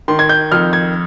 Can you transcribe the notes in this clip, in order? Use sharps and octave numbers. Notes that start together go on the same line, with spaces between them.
D#3 C6
G#6
G6
F2 F6
G#6